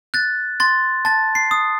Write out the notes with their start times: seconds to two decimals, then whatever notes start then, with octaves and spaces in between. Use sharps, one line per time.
0.14 F#6 A6
0.60 C6 A6
1.05 A5 A6
1.35 C7
1.51 D#6